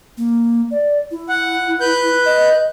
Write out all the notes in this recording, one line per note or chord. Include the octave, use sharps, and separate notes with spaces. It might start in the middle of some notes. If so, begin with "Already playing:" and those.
A#3
D5
E4
F#5
B4 F#6 G6
D#5